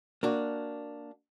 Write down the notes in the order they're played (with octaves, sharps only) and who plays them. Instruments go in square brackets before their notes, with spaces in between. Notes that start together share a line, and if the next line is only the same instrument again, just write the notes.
[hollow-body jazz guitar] A#3 D4 F#4